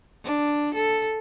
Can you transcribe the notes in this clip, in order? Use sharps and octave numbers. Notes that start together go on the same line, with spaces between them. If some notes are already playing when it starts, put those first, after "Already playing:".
D4
A4